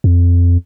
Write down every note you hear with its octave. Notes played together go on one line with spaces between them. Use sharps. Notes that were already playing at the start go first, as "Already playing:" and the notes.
F2